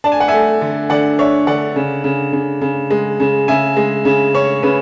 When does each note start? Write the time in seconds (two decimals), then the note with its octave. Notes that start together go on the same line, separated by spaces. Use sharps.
0.04 D4 A5
0.12 G#5
0.20 F#5
0.28 A3 E5 G#5
0.61 D3
0.90 D3 D5 F#5
1.19 D4 C#5 E5
1.47 D3 D5 F#5
1.76 C#3
2.04 C#3
2.33 C#3
2.62 C#3
2.91 G#3
3.20 C#3
3.48 C#3 E5 G#5
3.77 G#3
4.05 C#3
4.34 C#4 C#5
4.63 C#3 B4